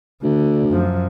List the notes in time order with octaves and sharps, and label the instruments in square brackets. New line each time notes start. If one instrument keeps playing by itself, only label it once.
[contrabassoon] D2 [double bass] D3
[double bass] F#2 F3